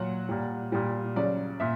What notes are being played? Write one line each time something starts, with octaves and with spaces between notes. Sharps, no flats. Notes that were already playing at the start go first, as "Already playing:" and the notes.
Already playing: A#2 F#3 F#5
A#2 G3
A#2 G3
C#3 F#3 D5
A#2 E5